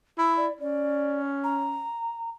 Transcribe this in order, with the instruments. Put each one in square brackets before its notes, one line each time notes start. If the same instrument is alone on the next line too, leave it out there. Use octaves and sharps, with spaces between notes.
[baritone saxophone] E4 [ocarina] E6
[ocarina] D5
[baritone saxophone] C#4 [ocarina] D5
[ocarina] A#5